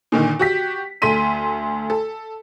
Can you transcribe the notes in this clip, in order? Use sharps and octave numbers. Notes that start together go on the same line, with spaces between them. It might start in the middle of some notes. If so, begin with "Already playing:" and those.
A#2 D3 D#3
F#4 G4 B6
D2 A4 C6 B6 D#7
A4